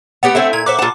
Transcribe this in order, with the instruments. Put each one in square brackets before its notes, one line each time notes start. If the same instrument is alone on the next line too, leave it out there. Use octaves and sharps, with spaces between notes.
[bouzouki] A3 B3 G4 [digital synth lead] F#5
[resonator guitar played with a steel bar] A3 C4 [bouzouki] E4 E5 G#5
[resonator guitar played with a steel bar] A#2 [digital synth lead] G#6
[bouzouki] C5 E5 F#5 [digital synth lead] D6
[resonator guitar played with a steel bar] A#2 A5 [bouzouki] F4 F#5